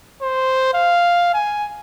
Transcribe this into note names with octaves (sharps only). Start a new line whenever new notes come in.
C5
F5
G#5